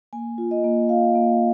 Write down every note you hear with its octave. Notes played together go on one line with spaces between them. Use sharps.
A#3 G#5
F4
D#5
A#3
F4 F5
A#3